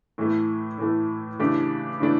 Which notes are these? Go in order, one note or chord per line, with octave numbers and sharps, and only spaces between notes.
A2 E3 A3
A2 E3 A3
C#3 E3 A3 D4 G4
C#3 E3 A3 D4